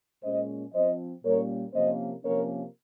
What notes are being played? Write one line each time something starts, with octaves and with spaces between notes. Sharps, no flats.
A#2 G#3 C#4 C5 D#5
F3 C4 C5 D#5
A#2 G3 A#3 C#4 A#4 C#5
C3 F3 A#3 C#4 C5 D#5
C3 F3 A#3 C#4 A#4 C#5